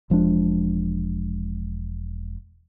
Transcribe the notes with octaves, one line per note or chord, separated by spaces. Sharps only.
E1 F3 G#3 D4